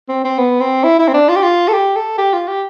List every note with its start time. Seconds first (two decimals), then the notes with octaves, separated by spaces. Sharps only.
0.09 C4
0.24 C4
0.38 B3
0.61 C4
0.84 E4
0.99 E4
1.08 C4
1.14 D4
1.29 F4
1.36 G4
1.43 F4
1.68 A4
1.73 G4
1.96 A4
2.18 G4
2.33 F4
2.48 G4